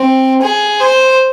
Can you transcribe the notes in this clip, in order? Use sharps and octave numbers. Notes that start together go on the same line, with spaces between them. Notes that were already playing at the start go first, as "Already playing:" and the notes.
Already playing: C4
G#4
C5